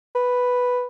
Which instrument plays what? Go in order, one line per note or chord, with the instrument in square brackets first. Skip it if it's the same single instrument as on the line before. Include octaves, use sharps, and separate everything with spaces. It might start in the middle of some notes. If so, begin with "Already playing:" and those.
[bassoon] B4